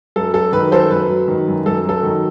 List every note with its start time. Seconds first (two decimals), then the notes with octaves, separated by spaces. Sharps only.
0.16 F#2 A4
0.34 F#3 A4
0.52 D#3 B4
0.72 F#2 A4 C5
0.90 F#2 B4
1.09 F#3
1.28 D#3
1.47 F#2
1.66 F#2 A4
1.85 F#3 A4
2.03 D#3